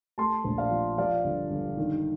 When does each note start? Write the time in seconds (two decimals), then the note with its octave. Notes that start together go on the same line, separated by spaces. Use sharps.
0.18 A3 A5 C6
0.44 A#1
0.58 D5 F5
0.71 F3
0.97 F3 D5 F5
1.24 G1
1.51 G1
1.77 D#3